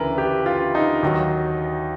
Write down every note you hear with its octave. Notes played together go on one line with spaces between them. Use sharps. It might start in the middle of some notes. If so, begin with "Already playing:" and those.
Already playing: D2 C#3 E3 A#4 B4
G4
F4
D#4
D#2 D#3 F#3